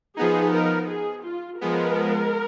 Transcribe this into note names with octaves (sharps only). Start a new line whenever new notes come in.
F3 B3 D#4 G#4
A#4
G#4
F4
F3 G#3 B3 A#4